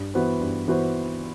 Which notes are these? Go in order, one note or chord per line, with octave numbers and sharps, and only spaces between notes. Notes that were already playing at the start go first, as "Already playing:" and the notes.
Already playing: G2
E3 B3 F#4 C5
G2
E3 B3 F#4 C5